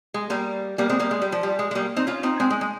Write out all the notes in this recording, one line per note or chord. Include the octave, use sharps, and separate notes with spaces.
G#3
G3 A#3
G3 A#3
G#3 C4
G3 A#3
G#3
G3
F3
G3
G#3
G#3
G3 A#3
C4 D#4
C#4 F4
C4 D#4
G#3 C4
G#3
G#3